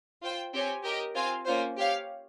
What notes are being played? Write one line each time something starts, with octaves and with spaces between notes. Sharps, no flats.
F4 C5 G5
C4 G4 C#5 G#5
G4 A#4 D#5
C4 F4 C5 F5 G#5
A#3 C#4 F4 C5
G4 C#5 F5